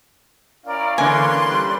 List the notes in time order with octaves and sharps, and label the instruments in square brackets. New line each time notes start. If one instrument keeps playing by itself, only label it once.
[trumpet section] C#4 E4 F5 [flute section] A#4 D5
[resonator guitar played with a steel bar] D3 E3 A#3 [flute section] B4 D5 C6 [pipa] G#5
[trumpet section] G3